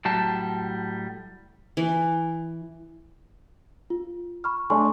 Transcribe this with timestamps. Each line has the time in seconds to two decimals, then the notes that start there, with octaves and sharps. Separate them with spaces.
0.05 A2 F#3 G3 A5
1.77 E3
3.90 F4
4.44 B5 C#6 F6
4.70 A3 D4 G#5 C6 C#6